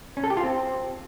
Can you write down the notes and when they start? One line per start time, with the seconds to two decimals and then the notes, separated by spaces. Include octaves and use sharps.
0.17 C#4
0.24 A4
0.30 G4
0.37 F4
0.43 C4